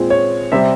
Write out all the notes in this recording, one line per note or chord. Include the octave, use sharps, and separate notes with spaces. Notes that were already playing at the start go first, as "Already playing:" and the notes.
Already playing: A#2 G#3 C4 F4
C#5
C3 G3 C4 E5